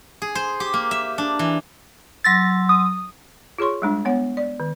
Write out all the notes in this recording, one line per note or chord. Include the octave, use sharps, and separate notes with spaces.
G#4
C5
G4
A#3
E5
D4
E3
F#3 C6 E6 A6 A#6
D#6
F4 G#4 C#5 C6 C#6
G3 G#3 D4
B3 C#5 F#5
D5
D#3